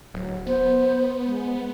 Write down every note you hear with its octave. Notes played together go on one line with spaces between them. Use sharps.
D1 F#3
B3 C5
G#3